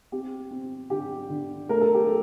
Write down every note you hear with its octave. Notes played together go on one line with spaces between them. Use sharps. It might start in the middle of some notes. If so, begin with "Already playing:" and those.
C4 G4
C4
D3 G4
D3
A3 A#4
A4
G4
A4